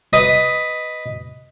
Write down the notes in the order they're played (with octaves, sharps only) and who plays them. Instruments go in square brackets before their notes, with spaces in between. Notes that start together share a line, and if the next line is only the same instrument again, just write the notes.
[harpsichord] B4 D#5